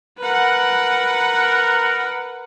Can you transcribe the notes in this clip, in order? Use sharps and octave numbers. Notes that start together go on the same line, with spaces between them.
A#4 B4 F#5